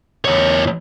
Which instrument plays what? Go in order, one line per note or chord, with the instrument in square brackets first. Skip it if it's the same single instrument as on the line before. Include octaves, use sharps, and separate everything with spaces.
[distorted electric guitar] E2 C#5